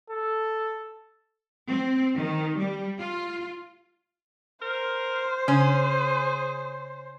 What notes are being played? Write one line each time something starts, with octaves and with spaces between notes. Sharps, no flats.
A4
C4
D#3
G3
F4
A#4 C5
C#3 C#4 G#4